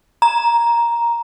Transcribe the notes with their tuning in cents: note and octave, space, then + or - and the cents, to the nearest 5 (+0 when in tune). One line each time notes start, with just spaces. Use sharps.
A#5 +10